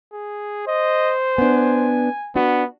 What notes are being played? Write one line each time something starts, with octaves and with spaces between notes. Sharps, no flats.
G#4
C5 D#5
B3 D4 G#5
B3 D4 F#4